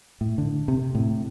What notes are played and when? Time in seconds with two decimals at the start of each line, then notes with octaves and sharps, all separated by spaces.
0.21 A2
0.38 D3
0.68 C3
0.95 A2